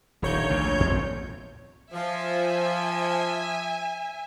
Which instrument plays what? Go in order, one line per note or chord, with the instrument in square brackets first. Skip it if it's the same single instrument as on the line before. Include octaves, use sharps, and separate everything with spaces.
[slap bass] D#1 D#3 [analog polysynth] A#1 C#5 G6
[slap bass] D2 A#2
F2 A#2 C4
[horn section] F3 [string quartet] E5 G#5